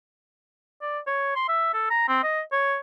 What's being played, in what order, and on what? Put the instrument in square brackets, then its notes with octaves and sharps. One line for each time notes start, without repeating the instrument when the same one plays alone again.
[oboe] D5
C#5
C6
E5
A4
A#5
C4
D#5
C#5